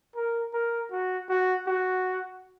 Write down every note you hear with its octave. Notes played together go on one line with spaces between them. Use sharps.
A#4
A#4
F#4
F#4
F#4